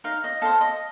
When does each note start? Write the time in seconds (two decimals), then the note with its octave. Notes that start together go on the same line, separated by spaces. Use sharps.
0.04 D#4 F5
0.24 D#5
0.42 A4 C5 F5
0.61 D#5